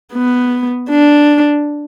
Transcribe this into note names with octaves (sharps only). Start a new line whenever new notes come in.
B3
D4